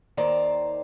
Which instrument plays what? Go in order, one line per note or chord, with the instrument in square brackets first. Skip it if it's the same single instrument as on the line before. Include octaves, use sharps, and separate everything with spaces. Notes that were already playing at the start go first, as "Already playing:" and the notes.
[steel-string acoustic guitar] D#2 D#3 C5 D5 A#5